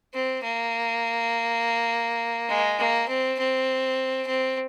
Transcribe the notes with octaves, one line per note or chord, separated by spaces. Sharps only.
C4
A#3
G#3
A#3
C4
C4
C4